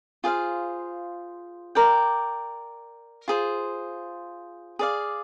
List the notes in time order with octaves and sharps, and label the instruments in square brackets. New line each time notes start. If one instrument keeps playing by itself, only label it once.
[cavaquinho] F4 G#4 C5 F5
A#4 D5 G5
F4 G#4 C5
G#4 D5 F5